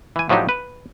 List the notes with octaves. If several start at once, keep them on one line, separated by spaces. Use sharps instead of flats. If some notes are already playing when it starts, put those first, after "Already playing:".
E3 G#5
A2 F3 F#3 D4 D#4 G4
B4